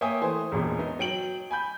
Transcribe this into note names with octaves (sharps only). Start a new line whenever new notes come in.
A#3 C#5 E5 G5 G#5 D#6
E3 A3 C5 G#5
E1 A1 A#2
B3 D#4
F#3 G5 D7 F#7
G#5 B5 G6